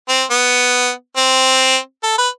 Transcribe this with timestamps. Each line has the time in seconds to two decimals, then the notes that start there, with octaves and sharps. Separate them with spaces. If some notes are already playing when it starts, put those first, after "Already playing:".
0.09 C4
0.30 B3
1.17 C4
2.03 A4
2.18 B4